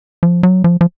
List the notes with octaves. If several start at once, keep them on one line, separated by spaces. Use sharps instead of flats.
F3
F#3
F3
F3